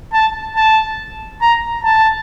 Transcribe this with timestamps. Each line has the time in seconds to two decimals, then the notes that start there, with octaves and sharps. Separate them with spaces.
0.13 A5
0.55 A5
1.41 A#5
1.84 A5